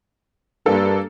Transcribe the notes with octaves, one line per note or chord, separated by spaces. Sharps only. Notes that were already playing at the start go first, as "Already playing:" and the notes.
G2 A#3 D4 A4